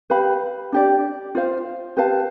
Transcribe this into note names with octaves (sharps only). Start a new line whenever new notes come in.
G4 B4 F5 B5
D4 G4 D5
F4 C5 F5
G4 B4 F5 A5